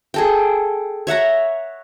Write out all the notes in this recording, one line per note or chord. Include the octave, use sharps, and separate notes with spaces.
G#4 A4 G5
C#5 E5 F#5 A#5